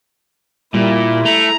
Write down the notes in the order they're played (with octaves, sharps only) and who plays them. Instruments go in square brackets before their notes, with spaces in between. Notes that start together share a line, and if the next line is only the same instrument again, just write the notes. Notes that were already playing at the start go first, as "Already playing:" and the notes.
[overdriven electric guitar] A#2 [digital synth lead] G3 [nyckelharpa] E4
[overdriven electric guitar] A3 [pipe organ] A#5